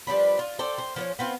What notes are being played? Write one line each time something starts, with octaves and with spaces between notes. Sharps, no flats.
F3 G3 D4 B4
F4
A4 C5 D5 G5
C5
F3 B3 C#4
B3 C4 F4